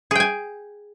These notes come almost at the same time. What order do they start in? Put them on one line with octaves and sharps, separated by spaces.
G#4 G5 G#5